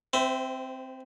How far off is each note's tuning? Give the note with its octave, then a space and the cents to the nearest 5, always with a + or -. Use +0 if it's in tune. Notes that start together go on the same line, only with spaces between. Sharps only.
C4 +0 C5 -35 E5 +0